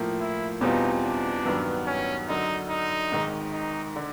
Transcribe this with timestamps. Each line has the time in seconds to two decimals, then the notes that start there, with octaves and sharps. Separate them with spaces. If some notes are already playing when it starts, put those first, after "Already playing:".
Already playing: A2 F3 A#3
0.20 E4
0.61 E2 B2 G3 C4 D#4 F4
1.03 D4
1.45 G2 D#3 F#3 B3
1.87 C#4
2.28 F#2 D3 F#3 D#4
2.70 D#4
3.11 G#1 G#2 D#3
3.53 D#4
3.96 D3